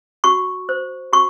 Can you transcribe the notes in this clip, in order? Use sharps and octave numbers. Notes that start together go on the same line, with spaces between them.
F#4 C#6
C5
F#4 C#6